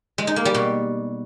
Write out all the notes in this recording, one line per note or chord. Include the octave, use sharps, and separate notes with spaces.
G#3
D#4
A#3
G3
B2